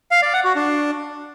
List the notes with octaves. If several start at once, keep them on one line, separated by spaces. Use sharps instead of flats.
F5
D5
F#5
F#4
D4